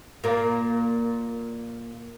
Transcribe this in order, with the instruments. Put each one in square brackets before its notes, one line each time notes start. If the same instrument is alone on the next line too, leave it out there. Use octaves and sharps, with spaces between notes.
[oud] A#2 A#3